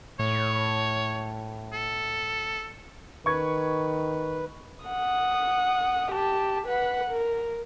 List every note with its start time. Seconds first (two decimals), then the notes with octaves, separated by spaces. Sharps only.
0.19 A2 C#5
1.73 A4
3.26 D#3 B4 C#6 G#6
4.86 F#5 D#6
6.12 G4 A5
6.67 B4 F#5
7.10 A#4